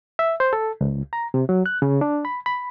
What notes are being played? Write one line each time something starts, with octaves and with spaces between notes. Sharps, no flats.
E5
C5
A4
C#2
A#5
C3
F#3
F#6
C#3
D4
B5
B5